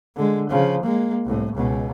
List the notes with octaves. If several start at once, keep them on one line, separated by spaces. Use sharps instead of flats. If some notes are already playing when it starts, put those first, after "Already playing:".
D3 G#3
C#3 F3
G#3 A#3
C2 A2
C#2 B2